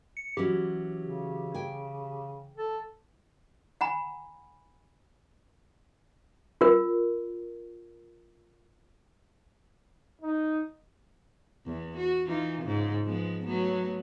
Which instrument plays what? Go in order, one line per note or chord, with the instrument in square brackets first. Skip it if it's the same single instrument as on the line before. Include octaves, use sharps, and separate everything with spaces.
[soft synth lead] C#7
[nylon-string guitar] E3 F#3 C#4 [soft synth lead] G4
[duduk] C#3
[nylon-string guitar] G5 G#5
[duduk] A4
[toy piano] F#5 G#5 A#5 B5
F4 A#4
[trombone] D#4
[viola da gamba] E2 B3
F#4
E3 D#4 F4
G#2 C#3
F3 G#3 B3
F#3 A3 B3